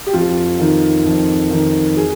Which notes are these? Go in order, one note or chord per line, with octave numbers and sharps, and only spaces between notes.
G4
F2 F4
D#3
F2
D#3
G#4